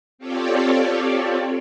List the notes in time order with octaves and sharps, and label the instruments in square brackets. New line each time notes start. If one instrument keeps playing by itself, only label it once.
[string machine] C4 F4 G4 A4 C#5 D5